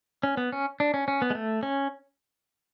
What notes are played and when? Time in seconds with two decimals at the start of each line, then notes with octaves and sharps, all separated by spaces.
0.23 C#4
0.37 B3
0.52 C#4
0.80 D4
0.94 C#4
1.08 C#4
1.22 B3
1.30 G#3
1.35 A3
1.63 C#4